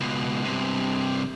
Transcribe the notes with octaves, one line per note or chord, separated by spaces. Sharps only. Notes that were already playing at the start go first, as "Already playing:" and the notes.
C#2 B2
G2 C3